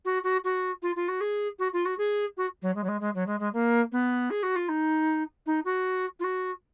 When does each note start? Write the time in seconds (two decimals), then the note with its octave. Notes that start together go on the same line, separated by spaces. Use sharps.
0.05 F#4
0.23 F#4
0.44 F#4
0.82 F4
0.95 F4
1.08 F#4
1.20 G#4
1.59 F#4
1.73 F4
1.85 F#4
1.97 G#4
2.37 F#4
2.62 F#3
2.75 G#3
2.83 F#3
2.88 G#3
3.00 G#3
3.14 F#3
3.26 G#3
3.39 G#3
3.53 A#3
3.91 B3
4.30 G#4
4.42 F#4
4.55 F4
4.68 D#4
5.46 D#4
5.65 F#4
6.19 F4
6.23 F#4